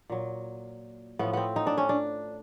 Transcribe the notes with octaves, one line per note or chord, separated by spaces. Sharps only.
A#2 F#3
A2 F3 B3
B3 C4
D#4
D4
C#4
D4